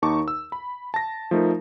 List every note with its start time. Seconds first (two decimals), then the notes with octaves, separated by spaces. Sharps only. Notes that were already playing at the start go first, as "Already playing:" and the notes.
0.02 D#2 D#4 A5 C#6 D6
0.28 E6
0.52 B5
0.94 A5 A#6
1.31 F3 A3 D#4 A#4